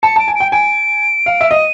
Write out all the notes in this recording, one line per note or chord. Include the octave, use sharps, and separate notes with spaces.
A5 C#7
A5 D7
G#5
D7
G5
G#5 D7
F5
E5
D#5 D#7